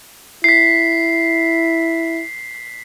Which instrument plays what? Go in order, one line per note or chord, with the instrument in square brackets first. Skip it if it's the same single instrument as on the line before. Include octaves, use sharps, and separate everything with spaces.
[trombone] E4 [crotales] B6 C7